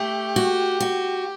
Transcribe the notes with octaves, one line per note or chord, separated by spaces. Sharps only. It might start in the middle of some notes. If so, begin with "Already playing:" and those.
Already playing: A3 G4
F#4
F#4